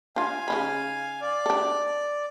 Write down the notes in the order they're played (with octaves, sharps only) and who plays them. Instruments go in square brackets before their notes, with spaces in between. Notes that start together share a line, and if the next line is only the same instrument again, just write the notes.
[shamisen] D4 F4 [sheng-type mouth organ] F5 G#5
[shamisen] C#3 D#4 B5
[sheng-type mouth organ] D5
[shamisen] D4 A4